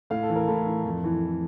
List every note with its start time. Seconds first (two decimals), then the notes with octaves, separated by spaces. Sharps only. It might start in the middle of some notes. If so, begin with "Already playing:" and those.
0.10 A2 F5
0.23 A4
0.29 E3
0.36 A#4
0.48 A2 A4
0.67 E3
0.85 F2
1.04 E3